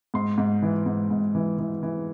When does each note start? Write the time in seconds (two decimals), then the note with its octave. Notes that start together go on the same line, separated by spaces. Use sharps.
0.14 G#2 C6
0.38 G#2
0.62 E3
0.86 G#2
1.11 G#2
1.35 E3
1.59 E3
1.83 E3